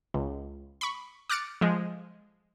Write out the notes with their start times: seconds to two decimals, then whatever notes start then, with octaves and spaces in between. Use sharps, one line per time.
0.14 C#2
0.81 B5 C#6
1.30 D6 F6 F#6 A6 C#7 D7
1.61 F3 G#3